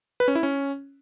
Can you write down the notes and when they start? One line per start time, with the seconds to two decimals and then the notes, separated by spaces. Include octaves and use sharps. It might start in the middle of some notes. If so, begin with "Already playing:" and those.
0.20 B4
0.28 C#4
0.35 E4
0.43 C#4